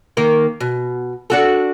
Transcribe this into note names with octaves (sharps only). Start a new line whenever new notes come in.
D#3 A#3 A#4
B2
D4 F#4 A4